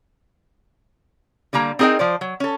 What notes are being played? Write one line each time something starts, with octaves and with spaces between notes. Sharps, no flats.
D3 G3 A#3 A#5
C4 D#4 G#4 A#4 D#5 G5
F3 C5 D5
F#3
C#4 A4